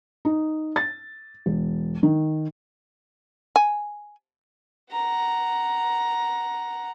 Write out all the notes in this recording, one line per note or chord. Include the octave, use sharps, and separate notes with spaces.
D#4
A6
E1
D#3
G#5
F#5 A#5